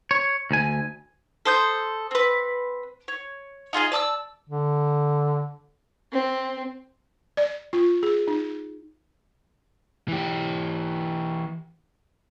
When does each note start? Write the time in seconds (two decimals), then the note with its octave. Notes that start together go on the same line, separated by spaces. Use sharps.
0.11 C#5
0.51 D2 G#5
1.45 A4 C5 D#6 G6
2.11 C4 B4
3.08 C#5
3.73 D#4 F4 G#4 D#5
3.92 D5 A5 D#6 E6
4.49 D3
6.12 C4
7.37 D5
7.73 F4
8.03 G#4
8.28 D#4
10.08 E3 G4